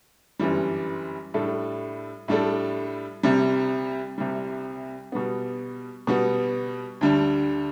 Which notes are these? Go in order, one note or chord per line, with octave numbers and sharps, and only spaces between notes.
G1 F#2 E3 G3
A2 G3 D4 A4
A2 G3 D4 A4
C2 C3 G3
C2 C3 G3
B2 G3 B3
B2 G3 B3
D2 D3 G3 D4